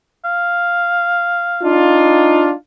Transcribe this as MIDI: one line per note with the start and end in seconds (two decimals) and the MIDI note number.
0.25 1.75 77
1.62 2.53 62
1.62 2.53 63
1.62 2.53 65